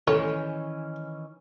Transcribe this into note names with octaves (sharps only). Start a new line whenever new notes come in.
A2 D#3 E3 C#4 C#5